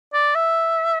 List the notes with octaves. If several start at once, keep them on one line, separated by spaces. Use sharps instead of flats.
D5
E5